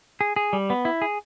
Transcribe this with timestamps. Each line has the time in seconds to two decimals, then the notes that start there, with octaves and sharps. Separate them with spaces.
0.21 G#4
0.36 G#4
0.53 G3
0.70 B3
0.85 E4
1.02 G#4